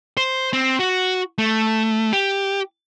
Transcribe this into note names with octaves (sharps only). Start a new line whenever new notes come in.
C5
C4
F#4
A3
G4